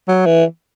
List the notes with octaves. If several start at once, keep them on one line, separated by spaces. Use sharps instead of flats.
F#3
E3